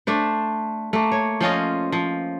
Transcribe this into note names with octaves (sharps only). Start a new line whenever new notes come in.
A3 D4 C5
A3 A#3
C#5
F3 C#4 F4 D#5
F3